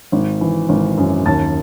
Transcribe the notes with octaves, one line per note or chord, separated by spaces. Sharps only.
G#1
E3
G#1
F#2
D#2 A5 A6